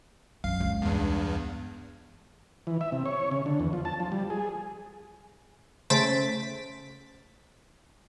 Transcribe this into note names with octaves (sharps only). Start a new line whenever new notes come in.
F#2 F5
C#2
E2 G2
E3
E5
C3
C#5
C#3
D3
E2
F3
A5
F3
G3
G#4
C#3 A3 C5 A6 B6 D7